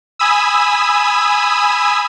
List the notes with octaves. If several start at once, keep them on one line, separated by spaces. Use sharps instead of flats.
G#5 B5 D#6 E6